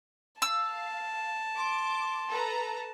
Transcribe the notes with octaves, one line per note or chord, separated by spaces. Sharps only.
F5 A5 E6
C6 D6
A4 B4 A#5